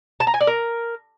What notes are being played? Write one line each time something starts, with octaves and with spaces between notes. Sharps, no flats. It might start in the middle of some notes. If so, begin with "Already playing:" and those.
A5
A#5
G#5
D5
A#4